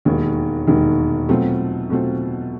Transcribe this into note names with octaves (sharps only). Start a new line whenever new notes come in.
E1 D#2 D#3
E1 D#2 D#3
B2 F#3 A3 C4 F4
B2 F#3 A3 C4 F4